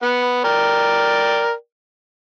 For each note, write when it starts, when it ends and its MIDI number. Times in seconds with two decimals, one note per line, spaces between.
0.02 0.43 59
0.02 0.43 78
0.44 1.52 70
0.44 1.52 74
0.44 1.52 79